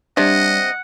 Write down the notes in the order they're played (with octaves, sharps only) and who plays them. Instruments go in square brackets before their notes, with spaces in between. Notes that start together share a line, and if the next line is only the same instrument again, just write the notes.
[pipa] C3 [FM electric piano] G3 D4 [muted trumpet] D#5 [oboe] F#5